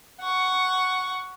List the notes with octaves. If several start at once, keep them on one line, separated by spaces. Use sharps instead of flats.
F#5 C#6